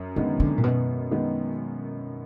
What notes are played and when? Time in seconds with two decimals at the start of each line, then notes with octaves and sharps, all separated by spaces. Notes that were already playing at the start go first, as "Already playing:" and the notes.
Already playing: F#2
0.16 D3 D#3 G#3 B3
0.40 D3
0.58 A#2
0.63 F#2 B2
1.11 D#3 G#3 B3